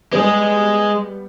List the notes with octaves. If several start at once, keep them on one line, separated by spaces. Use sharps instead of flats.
G3 G#3 B3 G#4